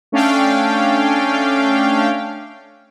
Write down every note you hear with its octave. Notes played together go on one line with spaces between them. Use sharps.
A3 C#4 D4 F5 G5